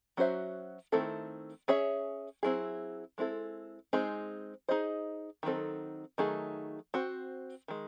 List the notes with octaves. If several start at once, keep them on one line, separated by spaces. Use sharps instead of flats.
F#3 C#4 F#4 C5 E5
D#3 A3 C4 E4 A4
C#4 G#4 C#5 E5
F#3 C4 E4 G#4
G#3 C4 E4 A4
G#3 C4 D#4 G#4 C5
D#4 G#4 C5 D#5
D#3 F#3 C4 D#4 A4
D#3 F#3 A3 D#4 G#4
C4 F#4 C5
D#3 G#3